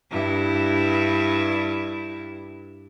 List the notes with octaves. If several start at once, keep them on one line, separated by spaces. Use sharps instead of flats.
G2 E4